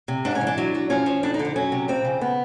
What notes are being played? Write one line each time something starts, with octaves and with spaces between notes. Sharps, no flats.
C3
G#2 D4
C#4
E3
D4
F#3
F#3
F3 C#4
F3
F2 D4
D#4
D3
D4
F#3 C#4
C3
F2 C4
C#3
B3